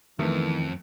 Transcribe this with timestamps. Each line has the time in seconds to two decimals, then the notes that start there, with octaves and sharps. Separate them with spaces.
0.19 F2 D#3 E3 A3 B3